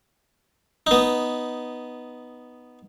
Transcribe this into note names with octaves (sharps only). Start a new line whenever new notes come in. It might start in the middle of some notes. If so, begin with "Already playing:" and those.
B3 D#4